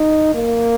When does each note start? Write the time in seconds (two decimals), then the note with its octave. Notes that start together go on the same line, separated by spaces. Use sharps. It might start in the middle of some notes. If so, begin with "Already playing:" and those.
Already playing: D#4
0.34 A#3